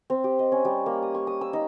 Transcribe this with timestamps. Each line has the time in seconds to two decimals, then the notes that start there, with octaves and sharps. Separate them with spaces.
0.10 C4
0.24 G4
0.39 D#5
0.52 C#4
0.65 G3
0.86 A#3
1.02 D#6
1.15 C#6
1.27 D#6
1.41 E6
1.53 D#4